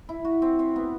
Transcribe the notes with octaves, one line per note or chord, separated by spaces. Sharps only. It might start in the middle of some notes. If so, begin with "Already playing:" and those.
E4
F#4
C4
C4
B3